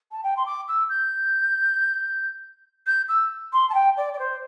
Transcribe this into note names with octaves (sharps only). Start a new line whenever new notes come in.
A5
G5
C6
D6
E6
G6
G6
E6
C6
A5
G5
D5
D5
C5